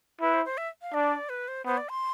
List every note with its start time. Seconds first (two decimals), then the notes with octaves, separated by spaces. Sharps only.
0.21 E4 B4
0.34 C5
0.45 C5
0.58 E5
0.82 F5
0.94 D4 D5
1.29 B4
1.48 C5
1.66 B3 C5
1.77 D5
1.90 C6